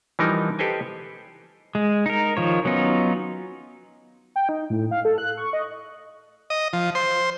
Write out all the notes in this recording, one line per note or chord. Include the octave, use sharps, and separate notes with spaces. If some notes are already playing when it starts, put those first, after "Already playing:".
E3 F3 G3 D#4 A#4
G4 A4 B4 C5 D#5 G#5
G#3
D#4 A#4
D#3 F3 C#5
F#3 B3 C#4 D#4 F4
G5
D#4
A2
F5
A4
F#6
C#6
D#5
D#5
F3
C5